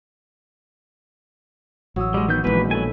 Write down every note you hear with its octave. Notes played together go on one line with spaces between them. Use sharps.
A1 F#3 D#6 E6
G3 G#3
D#3 B3 G6
A#1 B2 D#3 E3 G#3 E4 B4
F#3 A4 G#5